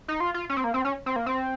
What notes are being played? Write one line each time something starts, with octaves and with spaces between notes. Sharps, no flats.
D#4
F4
F4
C#4
C4
A#3
C4
C#4
C4
A#3
C4